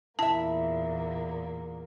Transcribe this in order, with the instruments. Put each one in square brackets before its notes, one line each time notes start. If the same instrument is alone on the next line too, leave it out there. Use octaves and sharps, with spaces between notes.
[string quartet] E2 A#2 A#3 [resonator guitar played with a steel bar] E4 E5 [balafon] A5